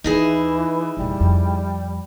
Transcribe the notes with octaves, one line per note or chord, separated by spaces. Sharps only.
D#2 E3 D#4 E4 G#4
E2 A#2 G3
F2